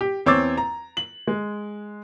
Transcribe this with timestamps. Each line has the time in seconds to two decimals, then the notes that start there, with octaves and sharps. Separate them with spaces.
0.01 G4
0.26 E2 C4 C#5 D6 E6 A6
0.57 A#5
0.97 F#7
1.27 G#3